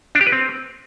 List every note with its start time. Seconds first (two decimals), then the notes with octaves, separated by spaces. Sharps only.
0.15 D4
0.21 G4
0.27 B4
0.32 C4